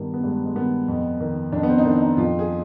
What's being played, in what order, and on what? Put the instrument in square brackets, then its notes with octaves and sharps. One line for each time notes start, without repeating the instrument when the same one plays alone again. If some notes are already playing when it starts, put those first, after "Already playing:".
Already playing: [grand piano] G2 D#3 B3
B3
G2 G#3
G#3
D#3 B3
F2
D#3
F2 D4
B3
C4
D#4
D#3 D4
D#4
F2 F4
G#4